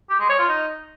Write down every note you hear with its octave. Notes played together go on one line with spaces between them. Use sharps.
G4
G#3
C#5
F4
D#4